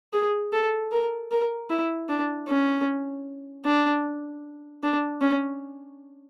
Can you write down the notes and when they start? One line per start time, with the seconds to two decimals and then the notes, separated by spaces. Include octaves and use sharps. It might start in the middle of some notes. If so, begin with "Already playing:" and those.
0.13 G#4
0.53 A4
0.92 A#4
1.32 A#4
1.70 E4
2.09 D4
2.48 C#4
3.65 D4
4.83 D4
5.21 C#4